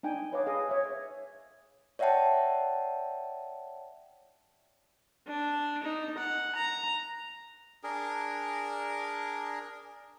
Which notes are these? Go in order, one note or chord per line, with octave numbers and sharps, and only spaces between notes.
D4 D#4 G5 G#5
B4 C#5 D#5 F5 A5 D6
G#4 D#5 F5
C#5 E5
C#5 D5 E5 F#5 G5 A5
D4
D#4
F#5
A#5
D4 G#4 A#4